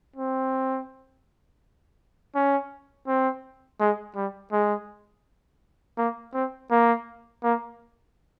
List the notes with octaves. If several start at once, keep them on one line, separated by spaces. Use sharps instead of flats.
C4
C#4
C4
G#3
G3
G#3
A#3
C4
A#3
A#3